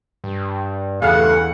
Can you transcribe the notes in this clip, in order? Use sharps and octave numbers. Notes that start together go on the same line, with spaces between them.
G2
E2 G2 C#3 A3 G#4 F5 F#5